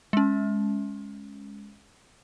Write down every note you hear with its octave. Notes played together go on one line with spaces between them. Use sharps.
G#3 C#4